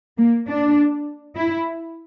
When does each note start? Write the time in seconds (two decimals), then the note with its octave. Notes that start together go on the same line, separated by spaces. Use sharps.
0.18 A#3
0.47 D4
1.36 E4